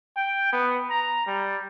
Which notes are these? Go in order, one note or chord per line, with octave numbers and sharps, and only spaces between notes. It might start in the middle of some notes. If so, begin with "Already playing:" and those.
G5
B3
A#5
G3